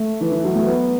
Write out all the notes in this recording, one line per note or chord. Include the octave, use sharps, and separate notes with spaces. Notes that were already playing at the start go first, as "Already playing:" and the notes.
Already playing: A3
E3
E3
F#3
A3
B3